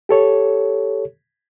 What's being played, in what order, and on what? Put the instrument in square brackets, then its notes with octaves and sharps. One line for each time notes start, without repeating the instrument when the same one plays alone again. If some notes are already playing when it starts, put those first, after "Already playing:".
[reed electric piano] G4 A4 C#5